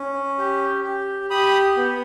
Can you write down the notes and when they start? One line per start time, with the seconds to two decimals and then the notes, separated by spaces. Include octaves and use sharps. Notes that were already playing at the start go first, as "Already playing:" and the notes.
Already playing: C#4
0.38 G4
0.84 G4
1.30 G4 B5 D#6
1.77 B3